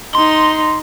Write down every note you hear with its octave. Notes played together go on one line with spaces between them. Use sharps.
D#4 C6